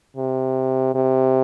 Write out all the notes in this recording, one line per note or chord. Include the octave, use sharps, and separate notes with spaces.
C3
C3